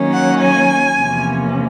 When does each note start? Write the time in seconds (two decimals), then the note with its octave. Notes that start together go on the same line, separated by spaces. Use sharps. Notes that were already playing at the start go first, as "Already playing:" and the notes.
Already playing: D#3 F#3 A#3 C#4
0.13 F#5
0.42 G#5
0.99 E2 C3 F3 A#3 C#4